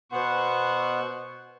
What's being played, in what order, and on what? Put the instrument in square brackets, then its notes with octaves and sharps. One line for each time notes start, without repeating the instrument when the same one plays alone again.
[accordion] B2 B3 F#5 [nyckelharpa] C5 C#6